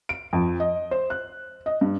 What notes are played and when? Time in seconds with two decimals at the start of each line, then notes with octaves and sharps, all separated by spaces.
0.09 D7
0.33 F2
0.60 D#5
0.91 C5
1.10 F#6
1.66 D#5
1.81 G2